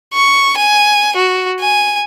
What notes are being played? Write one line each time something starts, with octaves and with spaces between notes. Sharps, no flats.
C#6
G#5
F#4
G#5